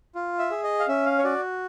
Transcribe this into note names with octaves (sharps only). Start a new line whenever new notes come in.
F4
E5
G#4
D#5
F5
C#4 E5
F5
C#5
F#4 D5